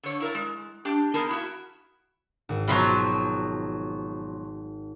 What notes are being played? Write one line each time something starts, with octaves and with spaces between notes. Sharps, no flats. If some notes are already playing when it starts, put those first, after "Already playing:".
D3 C#5
E4 A#4 D5
G#3
D4 G4
A#3 B3 D#4 G#4 A#4 A5
E4 F#4 E5
G#1
B2 F3 F#3